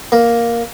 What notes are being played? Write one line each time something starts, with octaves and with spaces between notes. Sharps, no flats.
A#3